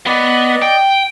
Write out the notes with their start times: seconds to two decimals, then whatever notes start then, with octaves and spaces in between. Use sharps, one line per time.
0.07 B3 D5 D#5
0.62 G5